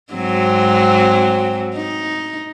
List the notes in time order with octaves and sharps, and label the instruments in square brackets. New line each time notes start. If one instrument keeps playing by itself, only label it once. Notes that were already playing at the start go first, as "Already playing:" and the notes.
[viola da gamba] G#2 F#3 C4
D#4